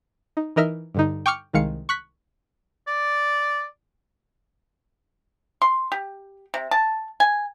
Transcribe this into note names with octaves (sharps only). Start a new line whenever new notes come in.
D#4
E3 D#4 A#4 D#5 E5 F6
G2 D3 D#4
G5 C#6 D6 F6 C#7
C2 D#3 G#3 F5 C#7
C#6 F#6 B6
D5
C6
G4
C3
A5
G#5